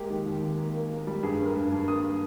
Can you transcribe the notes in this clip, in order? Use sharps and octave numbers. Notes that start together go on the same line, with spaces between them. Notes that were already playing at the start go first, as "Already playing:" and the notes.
Already playing: G#3 A#3 G4
D#3
D#2
A#3
A#3
A#3
A#3
G3
G2 G#4
G2
A#4
G2
G2
A#3 D#6